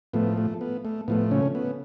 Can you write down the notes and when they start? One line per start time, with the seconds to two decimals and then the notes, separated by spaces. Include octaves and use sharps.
0.13 A2 F3 A3 B3
0.38 A3
0.61 B3
0.85 A3
1.08 A2 F3 A3 B3
1.31 C#3 C#4
1.55 B3